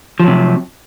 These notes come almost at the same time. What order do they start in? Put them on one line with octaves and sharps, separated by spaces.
F3 F#3 C3